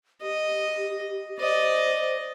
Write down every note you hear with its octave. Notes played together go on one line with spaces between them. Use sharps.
G4 D#5
C5 D5 D#5